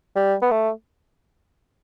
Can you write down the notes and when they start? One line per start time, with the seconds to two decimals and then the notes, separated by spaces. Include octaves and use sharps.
0.16 G3
0.42 B3
0.51 A3